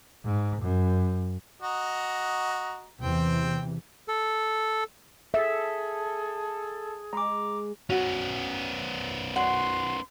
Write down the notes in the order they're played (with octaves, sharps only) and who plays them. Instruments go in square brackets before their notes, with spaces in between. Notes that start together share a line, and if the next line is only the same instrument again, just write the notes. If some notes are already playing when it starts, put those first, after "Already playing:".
[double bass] G#2
F#2
[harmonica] F#4 D#5 A#5
[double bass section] E2 C3 E3 [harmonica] C4 G5
[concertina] A4
[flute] G#4 [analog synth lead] A4 [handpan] E5
[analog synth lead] G#3 [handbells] A#5 D6
[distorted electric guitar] B3 C#4 [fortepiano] F#4
[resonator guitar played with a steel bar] F#3 F#5 [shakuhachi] C6